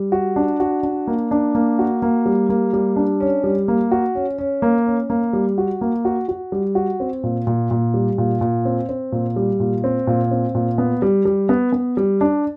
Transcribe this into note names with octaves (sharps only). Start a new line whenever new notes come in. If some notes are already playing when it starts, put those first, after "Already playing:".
Already playing: G3
F#4
D4
F#4
D4
A#3
D4
A#3
F#4
A#3
G3
A#3
G3
D4
C#4
G3
A#3
F#4
C#4
C#4
A#3
C#4
A#3
G3
F#4
A#3
F#4
F#4
G3
F#4
C4
A#2
A#2
A#2
G3
A#2
A#2
C4
C4
A#2
G3
A#2
C4
A#2
C4
A#2
B3
G3
G3
B3
B3
G3
D4